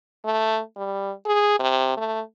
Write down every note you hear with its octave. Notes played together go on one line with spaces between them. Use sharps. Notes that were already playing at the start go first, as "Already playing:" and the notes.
A3
G3
G#4
C3
A3